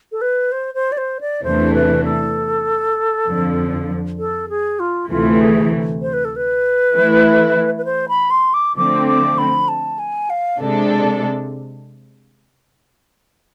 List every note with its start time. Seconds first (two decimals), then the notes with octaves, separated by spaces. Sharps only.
0.12 A4
0.22 B4
0.52 C5
0.74 C5
0.92 D5
0.98 C5
1.21 D5
1.43 E2 C3 E3 A3 D4 C5
1.74 B4
2.04 A4
3.27 F2 D3 F3
4.18 A4
4.49 G#4
4.80 F4
5.10 D2 C3 E3 A3 F4
5.41 G#4
6.02 C5
6.13 B4
6.25 A4
6.36 B4
6.94 E3 A3 E4
7.78 B4
7.85 C5
8.09 B5
8.31 C6
8.54 D6
8.76 D3 F3 A3 C4 D6
9.07 D6
9.38 B5
9.68 A5
9.99 G#5
10.30 F5
10.61 C3 G#3 D4 A4